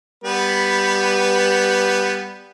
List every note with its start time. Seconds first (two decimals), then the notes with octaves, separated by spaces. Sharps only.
0.24 G3 B3 B4